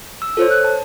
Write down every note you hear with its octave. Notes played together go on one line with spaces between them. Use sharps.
E6
F4 A4 C5 C#5
F#6
A5